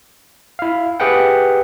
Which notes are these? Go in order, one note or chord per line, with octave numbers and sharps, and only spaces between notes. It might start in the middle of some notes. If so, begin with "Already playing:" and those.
E4 F5
G4 G#4 B4 E5 F#5 G5